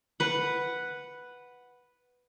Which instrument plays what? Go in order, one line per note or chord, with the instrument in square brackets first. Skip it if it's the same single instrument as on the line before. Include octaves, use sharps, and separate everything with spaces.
[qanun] B4 F#5